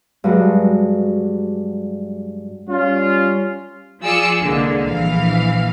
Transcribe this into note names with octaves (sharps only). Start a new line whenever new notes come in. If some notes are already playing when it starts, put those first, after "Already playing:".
G2 F#3 G#3
G3 C#4 F4
F3 F4 G#4 D5 E6 C#7
C2 D3 G#3 A#3
A#1 E3 F5